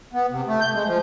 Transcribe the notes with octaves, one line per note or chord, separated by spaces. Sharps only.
B3
C3
A3
G6
G#3
F3